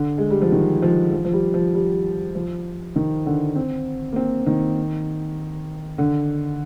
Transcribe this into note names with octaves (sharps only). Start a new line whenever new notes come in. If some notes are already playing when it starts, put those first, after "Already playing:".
Already playing: D3
G#3
G3
F3
D#3
F3
F3
F3
G3
F3
G3
F3
D#3
D3
C4
A#3
C4
D#3
D3